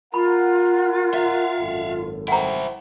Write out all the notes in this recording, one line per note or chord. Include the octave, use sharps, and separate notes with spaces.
F4 A#4 F#5 A#5 B5
E5 F5
G#1 F#2 A4
E4 C5 F#5 G5 A#5